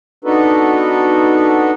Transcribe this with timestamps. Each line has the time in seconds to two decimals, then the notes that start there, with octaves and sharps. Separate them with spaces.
0.24 B3 D4 D#4 F#4 A4 B4